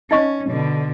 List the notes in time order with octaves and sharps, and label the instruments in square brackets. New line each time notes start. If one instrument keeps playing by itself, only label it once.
[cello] C#4 [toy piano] D#4 D#5 C#6
[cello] B2 D3